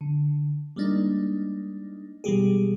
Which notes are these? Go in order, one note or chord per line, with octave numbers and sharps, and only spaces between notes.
D3
G3 G#3 A#3 D4 D#4
B2 E3 G3 G#3 G4 G#4